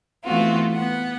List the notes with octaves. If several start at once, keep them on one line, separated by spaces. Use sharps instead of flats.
E3 A3 B3 C4 F4 F#4
B3 F#5